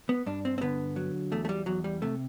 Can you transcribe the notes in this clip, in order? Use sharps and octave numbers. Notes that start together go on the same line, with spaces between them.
B3
G2 D4
C4
C4
D3 B3
F#3
E2 A3
A3
G3
E2 F#3
G3
C3 A3